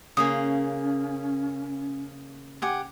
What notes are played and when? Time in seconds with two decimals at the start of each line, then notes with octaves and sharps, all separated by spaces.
0.17 C#3 A#3 C#4 G#4 D#6
2.62 G4 F#5 G#5